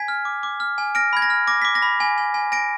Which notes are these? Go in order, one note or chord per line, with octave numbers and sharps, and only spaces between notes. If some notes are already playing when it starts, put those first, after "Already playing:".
Already playing: G#5 G#6 B6
F6
D6
D6
F6
G#5
F6 A#6 D7
B5 G#6
A#6
F6
D6 A#6
D6 B6
A#6
B5
G#5
G#5
G#5
G#5 A#6 D7